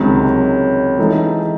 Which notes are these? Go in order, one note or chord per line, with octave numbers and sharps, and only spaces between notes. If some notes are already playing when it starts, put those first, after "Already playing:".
Already playing: C#2 C3 D#3 F#3 C#4
E3 G#3 D#4 A4